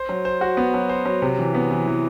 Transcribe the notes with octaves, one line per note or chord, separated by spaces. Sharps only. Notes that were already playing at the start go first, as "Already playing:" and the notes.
Already playing: C5
F#3
C5
F#4
B3
F#3
C5
F#3
C3
E3
B3
E3
E3